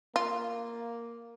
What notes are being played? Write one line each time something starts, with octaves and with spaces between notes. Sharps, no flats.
A#3 F4